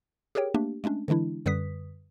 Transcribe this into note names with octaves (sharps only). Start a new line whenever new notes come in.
G4 G#4 A#4 C#5 G5
A3 A#3 D4 G4
G#3 A3 C#4 D4
D3 E3 G#3 D4 E4
F#2 D3 G3 B4 D#6 B6